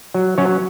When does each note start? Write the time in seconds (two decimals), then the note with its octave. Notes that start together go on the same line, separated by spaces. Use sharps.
0.14 F#3
0.38 F#3 C#4 C#5